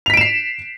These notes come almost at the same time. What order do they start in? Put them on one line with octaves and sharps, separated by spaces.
F7 B6 D7 E7 C7